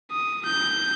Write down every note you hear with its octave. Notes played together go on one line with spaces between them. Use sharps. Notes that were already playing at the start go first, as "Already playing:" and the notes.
D#6
G6